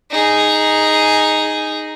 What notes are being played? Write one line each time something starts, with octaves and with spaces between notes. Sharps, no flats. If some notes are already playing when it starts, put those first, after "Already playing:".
D#4 G#4